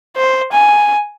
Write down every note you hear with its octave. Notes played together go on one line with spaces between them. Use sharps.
C5
G#5